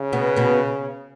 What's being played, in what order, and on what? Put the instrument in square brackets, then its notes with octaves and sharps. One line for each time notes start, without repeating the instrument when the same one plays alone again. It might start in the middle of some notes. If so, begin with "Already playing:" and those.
Already playing: [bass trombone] C#3
[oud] B2 B3
B2 B3